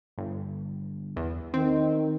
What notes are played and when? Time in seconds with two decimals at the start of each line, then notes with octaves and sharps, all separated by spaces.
0.18 G1
1.16 E2
1.54 D#3 C4